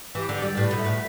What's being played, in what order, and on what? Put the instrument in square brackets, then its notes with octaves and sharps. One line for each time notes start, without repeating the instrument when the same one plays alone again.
[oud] E3 [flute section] G4
[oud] D3
[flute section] D5
[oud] G3
[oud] A2 [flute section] B4
[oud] B2
[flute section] E5
[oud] A2